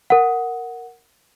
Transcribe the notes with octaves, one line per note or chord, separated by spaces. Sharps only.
A#4 F#5